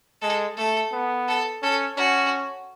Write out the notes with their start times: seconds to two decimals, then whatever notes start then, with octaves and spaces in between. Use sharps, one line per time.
0.22 G#3 A4
0.57 A3 A4
0.92 B3
1.28 A4
1.63 C#4 A4
1.97 C#4 F#4